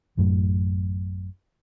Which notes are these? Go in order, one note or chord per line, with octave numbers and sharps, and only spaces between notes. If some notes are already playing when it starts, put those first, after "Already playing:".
A1 F#2 A2 F#3